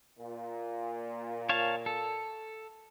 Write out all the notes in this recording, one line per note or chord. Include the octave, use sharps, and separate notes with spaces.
A#2
C#5 F5 A5
A4